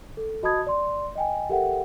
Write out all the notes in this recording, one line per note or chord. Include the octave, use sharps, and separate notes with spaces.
A4
F#4 D#5 A5 B5 D#6 G#6
D5 C6
D#5 G5 G#5
G4 A4 A#4 E5 F#5 G5